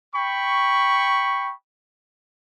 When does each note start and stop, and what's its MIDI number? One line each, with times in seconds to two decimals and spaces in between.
0.15 1.52 79
0.15 1.52 83
0.15 1.52 85